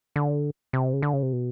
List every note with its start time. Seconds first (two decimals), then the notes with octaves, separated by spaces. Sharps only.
0.16 D3
0.73 C3
0.93 C#3
1.02 D3
1.13 C#3
1.23 C3
1.33 B2